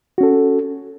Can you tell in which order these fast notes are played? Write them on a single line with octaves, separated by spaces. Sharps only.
F#4 C#4 A4